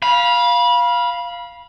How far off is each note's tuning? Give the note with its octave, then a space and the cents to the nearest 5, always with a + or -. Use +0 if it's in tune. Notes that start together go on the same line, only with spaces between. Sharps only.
F5 +0 B5 -25